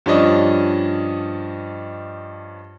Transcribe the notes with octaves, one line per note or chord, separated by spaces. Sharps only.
G2 F3 C#4 D4 D#5